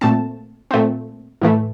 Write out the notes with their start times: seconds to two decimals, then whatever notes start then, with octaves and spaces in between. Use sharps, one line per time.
0.01 A#2 A3 C4 A5
0.71 A#2 A3 C4
1.42 A2 E3 A3